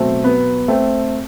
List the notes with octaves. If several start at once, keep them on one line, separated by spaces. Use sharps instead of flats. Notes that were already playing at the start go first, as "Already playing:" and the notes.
Already playing: B2 F#3 A3 C4
B3
A3 C4